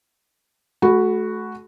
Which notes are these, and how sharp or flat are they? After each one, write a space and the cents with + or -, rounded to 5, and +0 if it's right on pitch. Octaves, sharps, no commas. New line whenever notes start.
A3 -35 F#4 +0 B5 +0